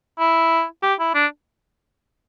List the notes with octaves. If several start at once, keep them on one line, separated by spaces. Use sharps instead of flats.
E4
G4
E4
D4